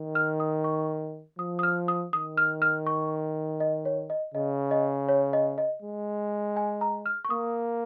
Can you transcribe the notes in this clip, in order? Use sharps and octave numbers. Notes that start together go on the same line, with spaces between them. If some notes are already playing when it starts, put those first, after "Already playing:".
Already playing: D#3
F6
D#6
C#6
F3 D#6
D#6
F6
D#6
D#3 D#6
F6
F6
C#6
D#5
C#5
D#5
C#3 D#5
D#5
C#5
D#5
D#5
G#3
G#5
A#5
F6
C#6
A#3 D#6